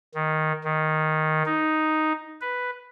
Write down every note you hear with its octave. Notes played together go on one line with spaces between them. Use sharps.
D#3
D#3
D#4
B4